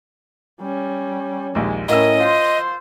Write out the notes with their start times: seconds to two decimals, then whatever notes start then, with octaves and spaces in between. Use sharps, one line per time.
0.61 G3 C#4
1.55 A#1 D#2 G#3
1.88 A2 C#4 E4 A#4 D#5 E6
2.20 F4 C5